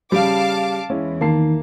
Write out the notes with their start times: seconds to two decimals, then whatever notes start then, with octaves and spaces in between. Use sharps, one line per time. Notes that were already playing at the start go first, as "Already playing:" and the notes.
0.12 C#3 G3 F5 A5 D6
0.90 E2 E3 G#3 C#4 E4
1.21 D#3 A#3 A5 C7